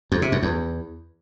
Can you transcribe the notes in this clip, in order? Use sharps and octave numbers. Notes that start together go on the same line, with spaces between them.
F2
C3
F#2
E2